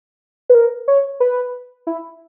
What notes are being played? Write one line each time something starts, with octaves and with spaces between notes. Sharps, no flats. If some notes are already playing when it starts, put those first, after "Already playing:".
B4
A#4
C#5
B4
E4